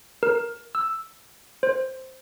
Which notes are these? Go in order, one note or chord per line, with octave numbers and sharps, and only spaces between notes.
A#4
E6
C5